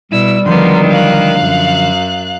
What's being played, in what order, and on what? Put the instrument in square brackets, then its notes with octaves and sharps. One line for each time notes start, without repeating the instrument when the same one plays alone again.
[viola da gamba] B2 [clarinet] G3 [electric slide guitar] E4 [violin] E6
[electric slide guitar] D3 F3 D4 [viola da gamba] D#3 F#3 [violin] B3 C6
[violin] F5 F#6
[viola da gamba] F#2